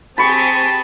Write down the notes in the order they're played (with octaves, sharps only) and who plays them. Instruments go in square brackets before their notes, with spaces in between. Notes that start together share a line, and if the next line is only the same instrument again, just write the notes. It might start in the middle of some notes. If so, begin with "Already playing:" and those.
[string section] C4 G4 G#4 [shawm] A5 [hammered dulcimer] B5 C#6